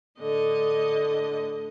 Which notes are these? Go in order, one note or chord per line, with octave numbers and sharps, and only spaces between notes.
A2 D3 D#5